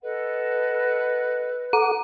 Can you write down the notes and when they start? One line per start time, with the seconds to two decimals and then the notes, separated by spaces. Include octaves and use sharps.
0.03 A4 B4 D#5 F#5
1.73 A4 F#5 A#5 D6